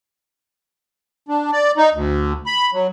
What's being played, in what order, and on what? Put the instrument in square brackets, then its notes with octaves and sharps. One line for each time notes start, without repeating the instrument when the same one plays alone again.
[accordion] D4
D5
D#4
D2
B5
F#3